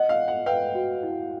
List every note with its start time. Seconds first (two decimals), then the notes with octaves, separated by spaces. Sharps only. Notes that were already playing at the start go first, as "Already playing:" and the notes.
Already playing: D#5 F#5
0.09 F5
0.18 D#5
0.28 F#5
0.46 B4 F5 G5
0.75 F#4
1.03 E4